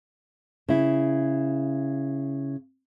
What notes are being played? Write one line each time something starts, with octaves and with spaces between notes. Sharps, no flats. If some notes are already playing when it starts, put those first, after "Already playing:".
C#3 E4